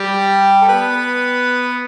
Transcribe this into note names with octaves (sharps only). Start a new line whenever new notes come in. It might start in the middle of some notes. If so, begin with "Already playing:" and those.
Already playing: G3 G4
A4
B3 B4